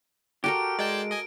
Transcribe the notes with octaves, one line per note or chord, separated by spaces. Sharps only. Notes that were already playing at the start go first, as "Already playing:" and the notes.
F#4 G4 A4 A#4 D7
G#3 D5 G5 A5
D#5 G#5